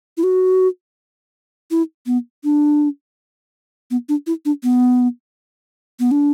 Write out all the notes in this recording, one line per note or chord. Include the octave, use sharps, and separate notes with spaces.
E4
F#4
E4
B3
D4
B3
D4
E4
D4
B3
B3
D4